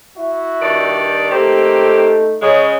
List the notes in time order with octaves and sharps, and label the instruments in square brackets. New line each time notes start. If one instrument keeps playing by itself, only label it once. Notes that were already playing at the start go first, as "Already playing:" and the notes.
[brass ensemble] E4 F#4 E5
[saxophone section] G2 D#3 D5
[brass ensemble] A3 D#4 A4 [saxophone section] A#3 C4 G4
[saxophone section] C#3 G#3